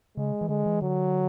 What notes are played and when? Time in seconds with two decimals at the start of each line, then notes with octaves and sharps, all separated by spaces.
0.17 C#3 G#3
0.41 E3
0.49 D3 G#3
0.66 E3
0.82 D3 F#3